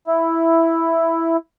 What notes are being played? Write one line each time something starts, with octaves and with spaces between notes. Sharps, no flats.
E4